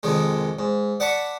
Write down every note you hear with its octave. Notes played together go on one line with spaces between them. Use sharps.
F2 C3 D#3 G#3
G#2
D5 F#5 A5 B5 C#6